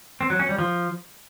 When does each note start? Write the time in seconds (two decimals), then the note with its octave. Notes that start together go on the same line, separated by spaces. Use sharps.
0.21 C4
0.30 F#3
0.40 C#4
0.49 G3
0.58 F3